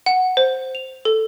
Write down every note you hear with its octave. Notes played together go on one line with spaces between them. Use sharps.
F#5
C5
F7
A4